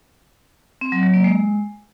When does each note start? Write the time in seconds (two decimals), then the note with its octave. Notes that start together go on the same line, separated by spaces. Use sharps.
0.81 C4
0.92 F#3
1.03 F#3
1.14 A#3
1.24 G#3